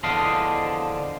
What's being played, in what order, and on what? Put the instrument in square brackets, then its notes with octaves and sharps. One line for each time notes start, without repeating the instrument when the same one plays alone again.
[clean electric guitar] E2 D3 F3 D4 D#5 F5